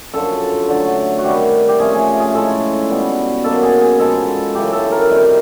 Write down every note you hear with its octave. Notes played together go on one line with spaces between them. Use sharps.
F#2 D3 F3 A4
D3 F#3 A3
F#4
C3 D#3 G3 G4
G4
C3 F3 A3 C#4 G#4
G#4
G#4
A2 F3 G#3 C#4 A4
B2 G3 B3
B2 F#3 A#3 C#4 A4
G#4
G#4
G#2 F3 G#3 B3 A4
F#2 C#3 E3 G4
A4
A#4
C3 D#3 G3